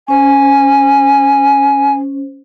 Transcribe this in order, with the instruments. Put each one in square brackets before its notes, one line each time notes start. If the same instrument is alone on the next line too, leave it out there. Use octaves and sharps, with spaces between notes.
[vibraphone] C#4 C5 [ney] G#5